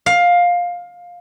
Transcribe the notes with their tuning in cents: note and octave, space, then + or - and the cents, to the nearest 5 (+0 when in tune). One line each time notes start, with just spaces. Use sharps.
F5 +15